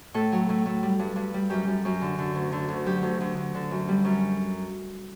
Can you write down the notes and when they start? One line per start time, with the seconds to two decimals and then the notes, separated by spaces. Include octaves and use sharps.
0.14 A2 A4
0.32 F#3
0.49 A2
0.66 A2
0.83 G3
0.99 G2
1.16 G2
1.34 G3
1.50 F#2 G4
1.68 F#2
1.85 F#2
2.01 D3
2.18 D3
2.35 D2
2.52 D3
2.69 D2
2.86 F#3 G4
3.03 D2
3.20 D2
3.37 D2
3.55 D3
3.71 F#2
3.88 G3
4.05 F#2